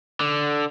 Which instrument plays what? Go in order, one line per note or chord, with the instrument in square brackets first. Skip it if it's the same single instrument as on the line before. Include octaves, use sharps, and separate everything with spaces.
[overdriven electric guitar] D3